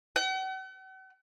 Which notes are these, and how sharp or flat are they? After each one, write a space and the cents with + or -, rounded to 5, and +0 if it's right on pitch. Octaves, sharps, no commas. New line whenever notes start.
F#5 +45